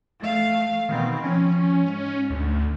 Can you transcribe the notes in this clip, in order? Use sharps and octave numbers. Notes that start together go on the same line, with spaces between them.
A3 F5
B2 D#3 C4
F3 C#4
G#2
D2